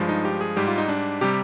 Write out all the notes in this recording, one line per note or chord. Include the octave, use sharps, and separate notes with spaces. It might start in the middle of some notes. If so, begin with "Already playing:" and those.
Already playing: G2 F3 G#3
D#4
G4
G#4
G#2 G3 G4
F4
D#4
D4
C3 G3 G4